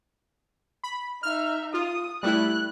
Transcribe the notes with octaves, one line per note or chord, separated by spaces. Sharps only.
B5
D#4 E5 F6
F4 D#6
G3 A3 E4 F#6